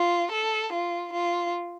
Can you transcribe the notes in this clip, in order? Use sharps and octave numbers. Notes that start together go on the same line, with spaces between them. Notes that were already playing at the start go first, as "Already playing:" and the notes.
Already playing: F4
A4
F4
F4